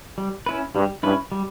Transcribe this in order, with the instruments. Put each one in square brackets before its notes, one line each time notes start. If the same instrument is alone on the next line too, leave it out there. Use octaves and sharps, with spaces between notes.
[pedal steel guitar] G3
C#4 E4 B4
[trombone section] G2 [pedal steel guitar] G3
[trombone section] G2 [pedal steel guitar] C#4 E4 B4
[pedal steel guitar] G3